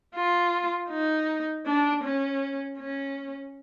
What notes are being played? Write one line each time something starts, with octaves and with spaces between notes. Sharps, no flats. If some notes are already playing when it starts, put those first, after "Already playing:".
F4
D#4
D4
C#4
C#4